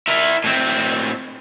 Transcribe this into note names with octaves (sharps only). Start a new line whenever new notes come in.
E4 A#4
A2 C4